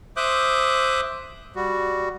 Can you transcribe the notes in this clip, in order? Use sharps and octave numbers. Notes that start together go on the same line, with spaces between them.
C5 E5 D6 D#6 F#6 G6
G3 F#4